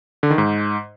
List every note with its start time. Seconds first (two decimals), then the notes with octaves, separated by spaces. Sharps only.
0.23 D3
0.30 D#3
0.38 G#2